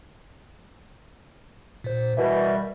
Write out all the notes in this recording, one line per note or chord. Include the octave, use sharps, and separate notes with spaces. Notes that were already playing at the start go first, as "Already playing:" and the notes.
A#2 C5
B2 E3 G3 A#4 D5 E5